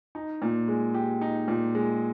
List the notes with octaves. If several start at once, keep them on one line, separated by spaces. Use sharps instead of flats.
D#4
A#2
G#3
G4
D#4
A#2
G#3